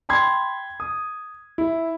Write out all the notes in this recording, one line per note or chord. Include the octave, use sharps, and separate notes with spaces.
G5 B5 C6 G#6
D#6
E4